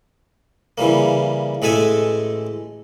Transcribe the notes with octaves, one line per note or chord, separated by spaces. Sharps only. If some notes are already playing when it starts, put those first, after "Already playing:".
C#3 E3 G3 A#3
A1 G#3 A4 E5 G#5